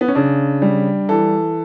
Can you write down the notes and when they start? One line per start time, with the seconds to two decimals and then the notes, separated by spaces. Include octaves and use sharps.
0.01 B3
0.08 C#4
0.15 C#3 D4
0.62 G3
1.09 E3 A4